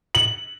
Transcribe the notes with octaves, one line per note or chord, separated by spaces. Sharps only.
F#7